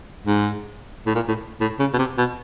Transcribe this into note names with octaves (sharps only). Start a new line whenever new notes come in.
G#2
A2
A#2
A2
A2
C#3
B2
C3
B2